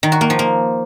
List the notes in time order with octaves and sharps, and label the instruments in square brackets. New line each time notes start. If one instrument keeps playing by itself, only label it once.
[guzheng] D#3
F#4
A#3
F3
A#3